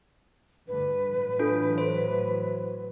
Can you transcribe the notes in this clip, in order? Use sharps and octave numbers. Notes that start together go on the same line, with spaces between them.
D2 G2 D3 B4
A2 E3 F#3
D4 F4 A4
C5